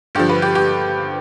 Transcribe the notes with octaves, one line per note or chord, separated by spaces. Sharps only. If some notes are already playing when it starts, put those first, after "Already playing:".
G2 D3 F3 G4
B4
G4
G4